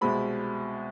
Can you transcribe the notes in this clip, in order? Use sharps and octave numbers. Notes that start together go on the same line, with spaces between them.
C2 B2 G#3 C4 B5